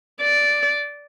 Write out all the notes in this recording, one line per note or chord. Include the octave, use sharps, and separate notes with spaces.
D5